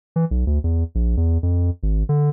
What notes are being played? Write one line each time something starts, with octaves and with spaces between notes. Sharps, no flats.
E3
B1
D2
E2
A#1
E2
F2
G#1
D3